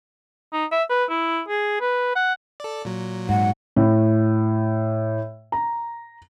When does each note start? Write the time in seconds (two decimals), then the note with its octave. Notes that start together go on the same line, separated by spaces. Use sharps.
0.53 D#4
0.71 E5
0.90 B4
1.10 E4
1.48 G#4
1.81 B4
2.16 F#5
2.60 A4 D5
2.85 A#2 F#3
3.29 G#2 F#5
3.76 A2
5.52 A#5